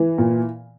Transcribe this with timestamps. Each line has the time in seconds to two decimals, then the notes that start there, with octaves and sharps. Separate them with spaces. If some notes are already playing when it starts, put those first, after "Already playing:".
Already playing: E3
0.18 A#2